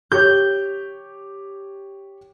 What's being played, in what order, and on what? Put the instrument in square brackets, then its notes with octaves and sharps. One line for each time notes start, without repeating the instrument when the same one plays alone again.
[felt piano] G4 C#5 [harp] G6